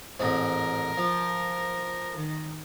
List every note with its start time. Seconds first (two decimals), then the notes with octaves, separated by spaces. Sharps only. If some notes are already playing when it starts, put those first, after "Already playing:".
0.19 A1 G#2 C4 A#4
0.97 F3
2.15 D#3